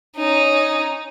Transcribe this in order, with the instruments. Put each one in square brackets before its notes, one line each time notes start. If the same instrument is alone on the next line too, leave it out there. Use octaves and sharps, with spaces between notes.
[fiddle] C#4 D#4